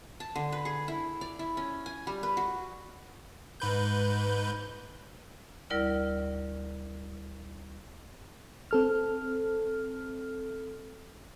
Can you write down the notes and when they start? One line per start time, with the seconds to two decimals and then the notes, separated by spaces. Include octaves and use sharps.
0.20 A5
0.36 D3
0.52 B4
0.65 G#4
0.88 E4
1.21 D5
1.39 E4
1.57 C#4
1.86 G#5
2.07 G3
2.23 B4
2.37 F#4
3.60 G#2 B4 G6
5.70 D2 G3 E4 A#4 D5 F6
8.71 C4 A4 F6